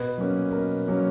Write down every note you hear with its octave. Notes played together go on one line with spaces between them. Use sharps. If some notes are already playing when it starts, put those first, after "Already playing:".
Already playing: B2 B4
F#3 A#3 C#4
B2 A#4
F#3 A#3 C#4